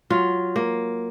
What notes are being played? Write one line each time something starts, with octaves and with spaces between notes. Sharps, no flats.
F#3 F4
A#3